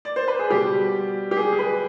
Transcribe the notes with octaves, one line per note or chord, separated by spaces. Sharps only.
D5
C5
B4
G#4
B2 G3 G4
G4
G#4
G#4
B4